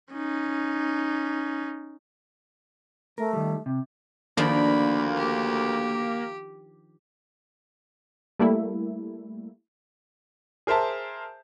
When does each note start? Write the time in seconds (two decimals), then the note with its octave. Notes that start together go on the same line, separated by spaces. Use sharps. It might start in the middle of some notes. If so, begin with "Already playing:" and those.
0.13 C#4 D#4
3.18 A3 A#4
3.33 D#3 G3
3.66 C3
4.37 D2 D#3 F3 A#3 D4 B5
5.16 G4
8.39 G3 A3 A#3 E4
10.67 G#4 A#4 C5 E5 A5